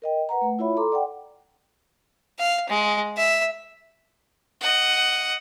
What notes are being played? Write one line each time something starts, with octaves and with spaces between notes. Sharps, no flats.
A#4 D#5 G5
B4 F#5 A#5
A3
E4 F4 C#5 E5 B5
A4 A#5 C6 D6
D5 F#5 G5
F5
G#3
E5
D#5 F#5